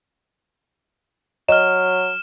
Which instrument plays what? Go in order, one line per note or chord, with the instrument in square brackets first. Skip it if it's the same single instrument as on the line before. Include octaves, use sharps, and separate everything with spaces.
[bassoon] F#3 [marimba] D#5 [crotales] F6 E7